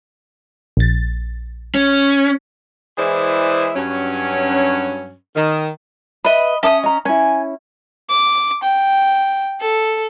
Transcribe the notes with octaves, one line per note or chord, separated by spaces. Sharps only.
A#1 A6
C#4
E3 G#3 E4 G#4 C5 D5
G2 F#3 C#4
D#3
B4 D#5 E5 B5
C#4 E5 A5 D6 D#6
D#5 A#5
C#4 E4 G#5
D6
G5
A4